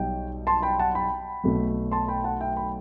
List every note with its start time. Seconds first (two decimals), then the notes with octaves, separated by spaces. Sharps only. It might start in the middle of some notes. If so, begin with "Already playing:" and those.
Already playing: B1 B2 G3 D#4 G5
0.47 A5 C6
0.62 G5 B5
0.79 F#5 A5
0.95 G5 B5
1.44 B1 B2 A3
1.91 A5 C6
2.08 G5 B5
2.24 F#5 A5
2.40 E5 G5
2.57 G5 B5